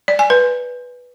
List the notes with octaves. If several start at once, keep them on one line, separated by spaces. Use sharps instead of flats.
D5
G#5
B4